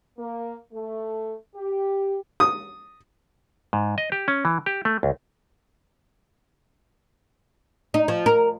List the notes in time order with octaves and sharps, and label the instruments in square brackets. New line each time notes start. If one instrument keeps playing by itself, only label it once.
[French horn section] A#3
A3
G4
[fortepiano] D#6
[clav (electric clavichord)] G#2
D#5
G4
C#4
E3
G4
A3
C#2
[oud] D#4
F3
A#4